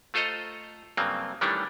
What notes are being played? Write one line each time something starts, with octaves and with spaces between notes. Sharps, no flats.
A3 F4 A4 C5 D#5 A#5
G2 C#3 F#3 A#3 C4
D#3 E3 G3 A3 C#4 D4